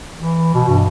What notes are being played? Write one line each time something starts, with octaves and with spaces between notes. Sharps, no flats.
E3
B2
G2